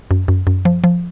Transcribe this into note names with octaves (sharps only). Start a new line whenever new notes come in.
F#2
F#2
F#2
F3
F3